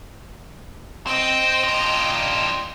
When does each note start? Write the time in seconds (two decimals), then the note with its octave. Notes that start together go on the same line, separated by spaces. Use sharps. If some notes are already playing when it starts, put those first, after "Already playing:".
1.07 C4 D#5 G5
1.63 D4 F4